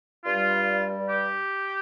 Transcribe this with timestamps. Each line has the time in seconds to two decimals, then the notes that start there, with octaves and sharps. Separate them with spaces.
0.25 G2 G3 F4
1.09 G4